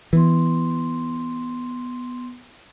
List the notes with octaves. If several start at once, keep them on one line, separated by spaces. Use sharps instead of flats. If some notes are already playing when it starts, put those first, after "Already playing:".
E3 B3 C6